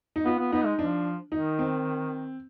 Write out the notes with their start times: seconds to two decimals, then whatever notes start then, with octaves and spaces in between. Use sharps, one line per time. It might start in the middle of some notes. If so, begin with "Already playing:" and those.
0.16 D#4
0.25 B3 F4
0.39 B3
0.52 B3 D#4
0.65 G#3
0.79 F3 D4
1.32 D#3 D#4
1.59 C4